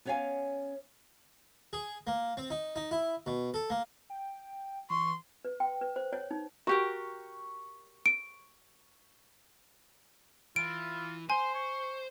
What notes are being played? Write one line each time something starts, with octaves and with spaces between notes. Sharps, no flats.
B3 C#4 C#5 E5 F5 G#5
G#4
A#3
C4
D#4
D#4
E4
B2
A4
A#3
G5
E3 C6 C#6
B4
G5
B4
C5
C#5
D#4
F#4 G4 A#4 C#6
D7
E3 F4 D7
C5 G#5 C6
C#6